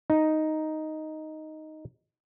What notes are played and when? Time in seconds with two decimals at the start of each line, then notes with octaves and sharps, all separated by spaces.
0.10 D#4